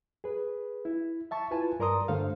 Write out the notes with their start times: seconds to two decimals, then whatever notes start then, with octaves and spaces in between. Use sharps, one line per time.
0.24 G#4 B4
0.85 E4
1.31 E5 A5 C#6
1.51 E4 F4 B4 G#5 A5
1.80 G2 A#4 D5 A#5 C6 D#6
2.08 G2 D3 A3 A4 C5 F5